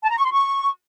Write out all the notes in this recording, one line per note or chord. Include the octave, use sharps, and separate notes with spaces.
A5
A#5
C#6
C6
C#6